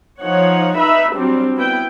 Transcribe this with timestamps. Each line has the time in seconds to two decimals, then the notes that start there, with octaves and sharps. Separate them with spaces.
0.20 F3 D#4 C#5 F#5
0.77 D#4 B4 E5 B5
1.13 F#3 G3 C4 D4
1.56 B3 E4 B4 G5